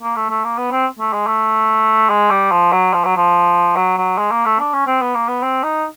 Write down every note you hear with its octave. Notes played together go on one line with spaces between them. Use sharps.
A#3
A3
A3
A#3
B3
C4
A3
G#3
A3
G#3
G3
F3
F#3
F3
F#3
F3
F#3
F#3
G#3
A#3
A3
D4
C#4
C4
B3
A#3
B3
C4
D#4